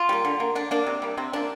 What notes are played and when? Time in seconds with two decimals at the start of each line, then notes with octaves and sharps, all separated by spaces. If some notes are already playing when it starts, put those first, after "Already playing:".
Already playing: F4
0.09 G3 A#3
0.25 D3
0.40 A#3
0.55 D3 D4
0.71 A#3 D4
0.86 C3
1.02 G3 A#3
1.17 C3 C4
1.33 F3 A#3 D4